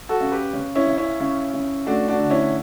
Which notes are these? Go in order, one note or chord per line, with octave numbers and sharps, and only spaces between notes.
F#4 A4
C#3
G4 B4
C#3
C#4 E4
C#3
C#4 E4
C#3
C#3
A3 D4 F#4
D4 F#4
D3
C#4 E4